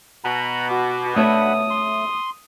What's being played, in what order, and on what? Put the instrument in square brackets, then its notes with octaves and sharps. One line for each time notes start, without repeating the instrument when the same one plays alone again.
[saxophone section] B2 [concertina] F#5 A#5 B5
[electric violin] F#4 [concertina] D6
[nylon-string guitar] A3 C#5 E5 [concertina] D4 F#5 B5 [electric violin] D#6
[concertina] C6